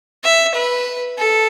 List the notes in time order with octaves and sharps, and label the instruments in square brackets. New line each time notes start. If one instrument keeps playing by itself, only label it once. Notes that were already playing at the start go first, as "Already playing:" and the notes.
[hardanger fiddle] E5
B4
A4